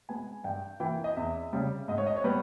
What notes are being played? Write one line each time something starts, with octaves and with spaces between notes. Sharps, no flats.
G#3 B3 G#5
G2 G5
E3 A#3 G5
D#5
E2 E5
C#3 G3
G#2 D#5
C#5
D#5
C#5
G3 B3 B4